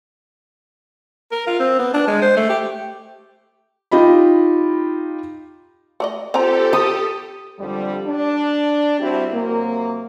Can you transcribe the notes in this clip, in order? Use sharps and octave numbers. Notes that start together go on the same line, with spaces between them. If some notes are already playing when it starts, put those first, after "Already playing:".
A#4
F4
C4
B3
D4
G#3
C5
A3
G4
D#4 F4 G4 D#5 B5
A3 D5 D#5
C4 F4 G4 A4 C5 G#5 A#5
D#6
F2 D3 G3
D4
G3 C4 E4 F#4 G4
C3 F#3 A#3